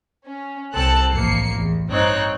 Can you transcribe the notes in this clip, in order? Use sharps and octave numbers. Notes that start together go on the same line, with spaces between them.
C#4
C2 C4 A4 A5 F#6 C#7
A1 F2 A#3 C7 C#7
E2
G2 C4 D#4 C5 C#5 F#6